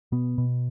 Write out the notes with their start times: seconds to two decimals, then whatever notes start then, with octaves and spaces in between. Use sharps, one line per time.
0.12 B2 B3
0.38 B2